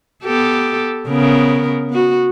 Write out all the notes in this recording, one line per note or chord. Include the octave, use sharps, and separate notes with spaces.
B3 G4 A4
C#3 B3 A#4
B3 F#4